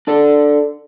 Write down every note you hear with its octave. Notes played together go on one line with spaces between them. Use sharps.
D4 A4 D5